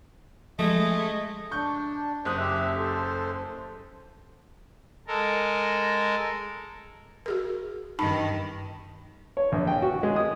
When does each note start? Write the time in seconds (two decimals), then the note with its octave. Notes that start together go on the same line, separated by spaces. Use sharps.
0.59 F3 G#3 A3 D#5
1.51 D4 C#6 G6
2.25 F#1 C5 D#6 F#6
2.38 G4 E5
2.76 A4 C5
5.07 G#3 A4 A#4
7.26 F#4 G#4 A#4
7.99 G2 D#3 D#4 A5 B5
9.37 C#5
9.52 A#1
9.67 G5
9.82 F#4
10.03 G#3
10.16 D#6